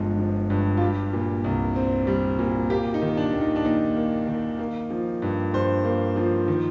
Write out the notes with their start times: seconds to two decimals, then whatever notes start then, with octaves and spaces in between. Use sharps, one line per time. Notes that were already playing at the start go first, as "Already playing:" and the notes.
Already playing: G1 G2 F3 G#3
0.19 F3
0.50 G2
0.77 F4
0.81 G3 G4
1.13 A#2
1.44 C2
1.76 C4
2.07 G3
2.39 A#2
2.70 A#3 G4
2.94 D#4
3.02 D#3
3.17 D4
3.33 D#2
3.41 D#4
3.56 D4
3.65 D#2 D#4
3.96 A#3
4.27 D#3
4.59 A#3
4.90 F3
5.22 G2
5.54 G2 C5
5.85 A#3
6.16 F3
6.48 D#3